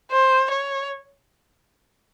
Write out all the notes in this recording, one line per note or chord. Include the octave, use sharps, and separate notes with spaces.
C5
C#5